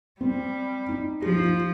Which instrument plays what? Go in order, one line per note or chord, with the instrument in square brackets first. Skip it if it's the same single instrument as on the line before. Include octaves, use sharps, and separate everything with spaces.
[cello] G3 [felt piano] C4
[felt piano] D#4
[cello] F3 [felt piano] G4
[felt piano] D#4
F4